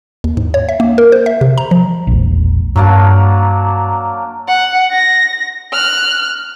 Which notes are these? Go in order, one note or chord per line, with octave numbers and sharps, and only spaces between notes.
D#2
G#2
C#5
E5
A#3
A#4
C5
E5
C3
A#5
F3
E1 A#1
G2 F#3 A#3 D4
F#5
A#6
F6 F#6